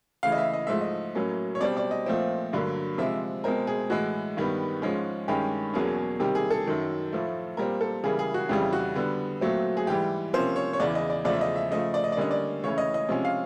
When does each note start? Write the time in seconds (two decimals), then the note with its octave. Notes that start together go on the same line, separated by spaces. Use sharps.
0.23 C#3 E3 A3 F5
0.32 D#5
0.38 E5
0.53 D#5
0.67 G#2 F3 A3 E5
0.81 D#5
1.15 A2 F#3 A#3 C#4
1.55 C#5
1.61 B2 G3 C4 D5
1.77 D5
1.91 D#5
2.06 A#2 F3 A3 C4
2.53 G2 D3 F#3 A#3
2.98 C3 F3 G#3 E5
3.44 B2 G#3 C4 A#4
3.67 G#4
3.90 A2 E3 G#3 F#4
4.37 G2 D#3 G3 B3
4.82 G#2 F3 G#3 C#4
5.28 G2 D#3 G#3 C#4 G4
5.74 E2 B2 F#3 A#3 C#4 G#4
6.20 C3 D#3 G3 A#3 G4
6.35 G#4
6.51 A4
6.66 F#2 D#3 F#3
7.13 A2 F3 A3
7.57 A#2 G3 C4 A#4
7.81 A4
8.04 C#3 E3 G3 A#3 G#4
8.19 G#4
8.34 F#4
8.49 F2 C#3 E3 G3 G4
8.73 F#4
8.95 D3 G3 B3
9.41 A#2 F#3 A3 C4
9.77 G#4
9.87 G#2 E3 G3 G4
10.33 C3 F3 A#3 C#4 C5
10.56 C#5
10.73 C#5
10.80 E2 C#3 E3 D5
10.95 D#5
11.10 D5
11.25 E2 C#3 F3 A3 D5
11.33 E5
11.41 D#5
11.56 E5
11.71 C#3 F3 A3 D#5
11.94 D5
12.04 D#5
12.12 D5
12.17 D3 G3 A#3 C#4 D#5
12.31 D5
12.64 C#3 E3 A3 C#4 C#5
12.78 D#5
12.94 D#5
13.09 C3 F3 G#3 C#4
13.25 F5